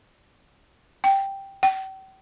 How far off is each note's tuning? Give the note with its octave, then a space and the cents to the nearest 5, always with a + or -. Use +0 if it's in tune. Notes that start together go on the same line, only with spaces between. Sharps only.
G5 +0
G5 -40